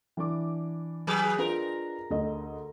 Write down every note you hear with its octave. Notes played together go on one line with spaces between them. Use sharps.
E3 D4 D6
F#3 G#4 B4
D4 F4 A#4 B4
D2 D#5